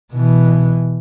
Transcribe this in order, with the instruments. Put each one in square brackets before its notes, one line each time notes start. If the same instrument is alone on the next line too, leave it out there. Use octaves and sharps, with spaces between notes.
[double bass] B2 E3